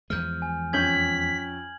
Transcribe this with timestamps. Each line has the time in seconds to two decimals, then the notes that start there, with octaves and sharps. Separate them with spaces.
0.10 E2 F3 G#3 F6 G6
0.42 G#5
0.73 F2 C#4 G6 G#6 B6 F#7